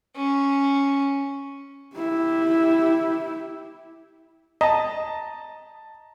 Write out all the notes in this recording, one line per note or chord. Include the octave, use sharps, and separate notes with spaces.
C#4
E4 G4
D#5 A5 A#5